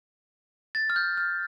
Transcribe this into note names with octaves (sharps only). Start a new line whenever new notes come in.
A6
F6
G6
F6